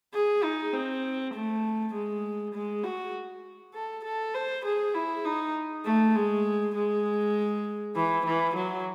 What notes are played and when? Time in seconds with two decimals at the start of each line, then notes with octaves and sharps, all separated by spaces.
0.14 G#4
0.44 D#4
0.73 C4
1.34 A3
1.94 G#3
2.54 G#3
2.84 F#4
3.74 A4
4.04 A4
4.35 C5
4.65 G#4
4.95 E4
5.25 D#4
5.85 A3
6.15 G#3
6.75 G#3
7.96 E3
8.25 E3
8.55 F#3